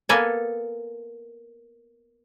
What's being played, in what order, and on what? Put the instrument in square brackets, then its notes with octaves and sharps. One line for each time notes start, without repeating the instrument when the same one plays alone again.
[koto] A#3 B3 A4 G#5